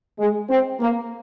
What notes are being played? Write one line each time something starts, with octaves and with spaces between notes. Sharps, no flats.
G#3
C4
A#3